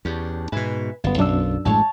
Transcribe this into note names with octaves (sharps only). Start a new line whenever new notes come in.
E2 C#4 D4 G4
G#2 B2 B4 E5 G#5
G1 F#2 B3 F4
B1 F#2 D4 E6
A1 A2 G#3 C#5 A5